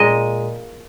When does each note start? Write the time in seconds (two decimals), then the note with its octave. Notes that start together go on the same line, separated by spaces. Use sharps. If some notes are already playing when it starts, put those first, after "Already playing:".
Already playing: A#2 G#3 D#5